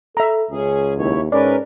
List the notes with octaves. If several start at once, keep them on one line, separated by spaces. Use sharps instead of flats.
A4 E5 A#5
C#2 C#4 G#4
D#2 E4 C#5
G#2 C#4 A#4 B4 D5